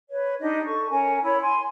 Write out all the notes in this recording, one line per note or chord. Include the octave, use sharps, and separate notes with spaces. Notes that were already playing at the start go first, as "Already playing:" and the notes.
B4 C#5
D4 D#4 G4 D#5
A4 C#6
C#4 A#4 G#5
E4 C#5 B5
G#5 C6